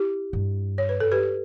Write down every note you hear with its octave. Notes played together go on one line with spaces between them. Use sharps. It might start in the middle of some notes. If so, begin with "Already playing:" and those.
Already playing: E4 G4
G2
C#5
B4
A4
G4 B4